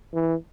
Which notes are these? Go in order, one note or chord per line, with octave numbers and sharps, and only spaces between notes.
E3